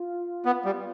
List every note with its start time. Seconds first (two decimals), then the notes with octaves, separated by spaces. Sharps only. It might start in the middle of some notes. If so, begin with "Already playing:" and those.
Already playing: F4
0.45 B3
0.65 G3